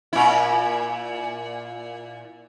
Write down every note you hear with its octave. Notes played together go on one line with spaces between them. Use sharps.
A#2 E4